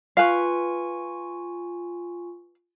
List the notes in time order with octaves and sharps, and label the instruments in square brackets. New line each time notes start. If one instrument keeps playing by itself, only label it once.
[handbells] F4 G#5 C#6 [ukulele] B4 F5